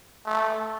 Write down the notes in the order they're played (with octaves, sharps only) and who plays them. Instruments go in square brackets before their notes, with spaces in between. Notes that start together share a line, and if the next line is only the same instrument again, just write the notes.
[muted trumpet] A3